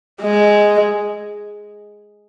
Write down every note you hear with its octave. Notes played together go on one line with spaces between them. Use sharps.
G#3